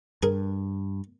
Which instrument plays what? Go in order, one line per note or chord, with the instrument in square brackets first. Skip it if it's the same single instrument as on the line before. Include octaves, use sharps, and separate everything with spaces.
[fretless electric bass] G2 [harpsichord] G#4 A#4